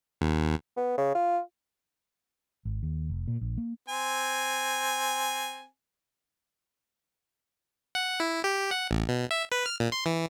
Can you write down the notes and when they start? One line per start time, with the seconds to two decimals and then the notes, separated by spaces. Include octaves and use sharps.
0.21 D#2
0.77 B3
0.97 C#3
1.15 F4
2.65 G#1
2.83 D#2
3.10 F1
3.28 A#2
3.41 A#1
3.58 A#3
3.89 C4 G#5
7.95 F#5
8.20 E4
8.44 G4
8.71 F#5
8.91 A1
9.09 B2
9.31 E5
9.52 B4
9.66 F6
9.80 A#2
9.92 C6
10.06 E3